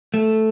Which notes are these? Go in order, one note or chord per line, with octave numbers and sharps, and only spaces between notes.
A3